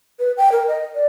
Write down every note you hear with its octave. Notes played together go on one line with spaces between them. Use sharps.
B4
G5
A#4
D#5
D5